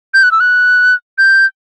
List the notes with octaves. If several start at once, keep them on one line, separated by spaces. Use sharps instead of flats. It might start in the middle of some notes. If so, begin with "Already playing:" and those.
G6
F#6
E6
F#6
G6